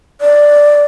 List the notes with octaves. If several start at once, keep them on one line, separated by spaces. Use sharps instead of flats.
D5